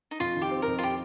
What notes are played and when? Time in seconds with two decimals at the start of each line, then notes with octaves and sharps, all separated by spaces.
0.11 D#4
0.20 F2 F4
0.36 D#3
0.42 G4
0.51 C4
0.62 A#4
0.67 F2
0.79 F4
0.83 G4